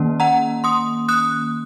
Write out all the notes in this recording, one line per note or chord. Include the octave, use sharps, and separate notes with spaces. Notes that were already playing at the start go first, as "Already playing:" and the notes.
Already playing: D#3 A#3 C#4
F#5 A#5
C6 D#6
D#6 F#6